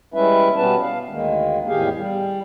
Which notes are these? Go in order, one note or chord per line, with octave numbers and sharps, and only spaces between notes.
G3 G#3 C#4 E4 B4 E5
B2 G3 B3 C#4 B4 A5
F5
D2 D#3 G#3 A#3
E2 A2 D#3 G4 G#4 F5
G3